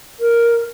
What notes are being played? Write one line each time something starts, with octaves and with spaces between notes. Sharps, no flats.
A#4